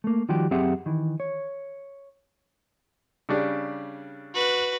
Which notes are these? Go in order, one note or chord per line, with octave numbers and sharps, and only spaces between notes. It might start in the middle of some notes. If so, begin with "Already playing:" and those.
A3 A#3
D#3 F3 G3 F#4 G4
F#2 C4 G4 G#4 E5 F#5
D#3 E3
C#5
C#3 G3 D4
F#4 B4